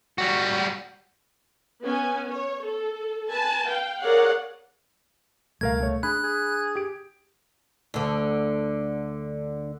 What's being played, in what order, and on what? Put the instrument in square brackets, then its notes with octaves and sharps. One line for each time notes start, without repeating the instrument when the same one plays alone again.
[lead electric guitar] G3 F#4
[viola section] B3 C#4 G#5
C#5
A4
B4 G#5 A5 B5
F5 G5
G#4 A#4 C#5 D5 F5 F#5
[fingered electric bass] C#2 B2 G3 [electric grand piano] A3 A#4 F5 [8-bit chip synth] G#6
[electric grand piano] A3 C#5
[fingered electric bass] D4 [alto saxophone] G#4 [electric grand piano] B5 [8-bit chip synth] F#6
[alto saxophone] G#4
[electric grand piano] G4 D7
[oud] D2 D3